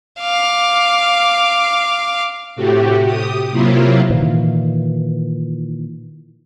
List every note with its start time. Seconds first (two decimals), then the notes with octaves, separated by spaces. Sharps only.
0.20 F5 D6
2.56 A2 C3 A3 F#4 G4
3.03 G4 D#6
3.52 C3 F#3 A#3 E4 F4
4.10 A#2 D#3 E3